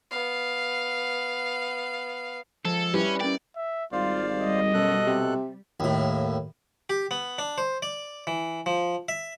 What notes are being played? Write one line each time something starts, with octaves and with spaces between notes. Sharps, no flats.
B3 F5
F3 G#3 A4 C5
G3 C#4 E4 G4 B4
C#4 A#4 D5 G5
E5
G#1 G3 F4 C5 D5 F5
D#5
F#2 B2 A4 F#6
C3
D#2 A2
G4
B3
D4
C5
D5
E3
F3
E5